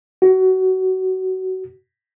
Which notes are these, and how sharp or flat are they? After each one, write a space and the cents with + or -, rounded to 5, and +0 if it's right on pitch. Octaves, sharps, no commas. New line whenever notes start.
F#4 +25